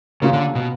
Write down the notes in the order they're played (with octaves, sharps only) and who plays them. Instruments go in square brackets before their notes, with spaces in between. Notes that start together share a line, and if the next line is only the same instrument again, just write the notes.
[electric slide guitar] C#3 [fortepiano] A#3 C#4 F4
[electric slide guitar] D3
B2